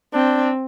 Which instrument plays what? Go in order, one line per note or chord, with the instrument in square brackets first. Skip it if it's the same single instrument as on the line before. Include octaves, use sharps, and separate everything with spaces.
[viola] C4 [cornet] D4